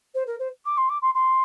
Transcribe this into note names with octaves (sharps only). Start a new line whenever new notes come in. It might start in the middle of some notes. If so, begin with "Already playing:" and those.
C5
A#4
C5
D6
C6
D6
C6
C6